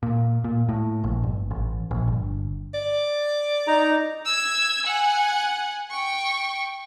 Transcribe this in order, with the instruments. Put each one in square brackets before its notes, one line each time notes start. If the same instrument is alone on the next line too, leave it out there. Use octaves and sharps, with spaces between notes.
[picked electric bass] A#2
A#2
A2
A#1
G1
A1
A#1
G1
[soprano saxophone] D5
[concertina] D#4 A#5
[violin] E6 G#6
F#5 G#5
G5 C#6